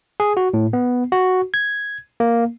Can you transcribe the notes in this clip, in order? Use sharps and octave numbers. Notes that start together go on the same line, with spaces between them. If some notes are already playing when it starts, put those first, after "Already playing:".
G#4
F#4
A2
B3
F#4
G#6
A#3